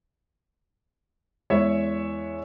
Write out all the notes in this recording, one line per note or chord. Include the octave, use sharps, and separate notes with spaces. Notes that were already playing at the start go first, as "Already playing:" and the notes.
E2 G#3 C#5 E5